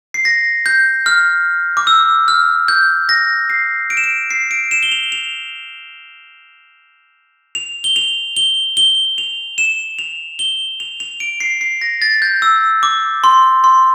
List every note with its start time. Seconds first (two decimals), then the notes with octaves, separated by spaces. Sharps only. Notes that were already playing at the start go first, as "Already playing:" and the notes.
0.14 C7
0.25 A#6
0.66 G6
1.06 F6
1.77 D6
1.87 E6
2.28 F6
2.68 G6
3.09 A#6
3.50 C7
3.90 D7
3.97 E7
4.04 D7
4.31 C7
4.51 D7
4.71 E7
4.83 G7
4.92 F7
5.12 F7
7.55 F7
7.84 G7
7.96 F7
8.36 G7
8.77 G7
9.18 F7
9.58 E7
9.99 F7
10.39 G7
10.80 F7
11.00 F7
11.20 D7
11.40 C7
11.61 C7
11.81 A#6
12.02 A6
12.22 G6
12.42 E6
12.83 D6
13.24 C6
13.64 C6